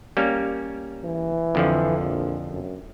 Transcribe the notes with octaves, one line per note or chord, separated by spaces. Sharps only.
G3 A#3 C#4
E3
F2 D3 F3
A#1
F#2